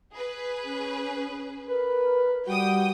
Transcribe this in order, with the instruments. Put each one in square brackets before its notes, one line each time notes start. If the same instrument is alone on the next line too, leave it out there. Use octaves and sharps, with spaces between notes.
[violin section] G#4 B4
[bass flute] C#4
[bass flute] A#4 [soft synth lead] B4
[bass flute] G3 [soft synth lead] F#4 [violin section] G5 D#6